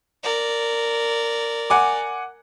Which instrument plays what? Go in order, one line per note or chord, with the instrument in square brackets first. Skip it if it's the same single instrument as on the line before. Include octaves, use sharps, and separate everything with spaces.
[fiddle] A#4 D5
[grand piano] F#5 G#5 D6